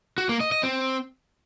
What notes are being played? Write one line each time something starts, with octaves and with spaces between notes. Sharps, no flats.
F#4
A#3
D#5
D#5
C4